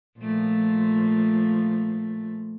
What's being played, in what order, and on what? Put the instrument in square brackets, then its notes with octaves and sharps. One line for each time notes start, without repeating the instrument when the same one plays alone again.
[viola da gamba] A#2 F3 A3